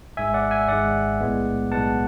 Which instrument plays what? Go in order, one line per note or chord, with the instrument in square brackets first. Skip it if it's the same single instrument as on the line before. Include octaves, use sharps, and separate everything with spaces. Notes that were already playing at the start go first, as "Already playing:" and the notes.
[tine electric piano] G#1 G#2 G#3 E5 G#5
D5 F#5
E5 G#5
G#1 G#2 G#3 D5 F#5
B1 A2 G#3 B3
B1 A2 G#3 B3 F#5 A5